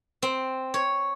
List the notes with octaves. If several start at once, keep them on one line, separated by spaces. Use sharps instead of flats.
C4
C#5